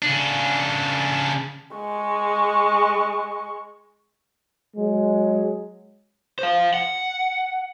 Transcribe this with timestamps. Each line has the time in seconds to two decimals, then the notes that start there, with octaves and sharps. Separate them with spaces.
0.03 C#3 D4
1.77 G#3 C#6
4.77 F#3 G#3
6.39 C5 F5
6.74 F#5